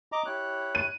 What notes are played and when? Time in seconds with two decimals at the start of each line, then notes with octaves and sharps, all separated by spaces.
0.12 D#5 A#5 D6
0.26 E4 G4 C#5 F#6
0.75 D#7